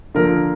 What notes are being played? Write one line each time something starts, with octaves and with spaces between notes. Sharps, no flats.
D3 F3 A#3 A#4